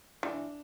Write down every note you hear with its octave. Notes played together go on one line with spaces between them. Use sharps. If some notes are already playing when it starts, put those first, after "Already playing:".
E3 D4